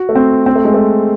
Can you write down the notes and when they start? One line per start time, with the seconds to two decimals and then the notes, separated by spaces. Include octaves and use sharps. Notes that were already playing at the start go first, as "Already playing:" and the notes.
Already playing: F#4
0.09 A3
0.15 C4
0.46 C4
0.56 A3
0.65 G#3
0.74 A3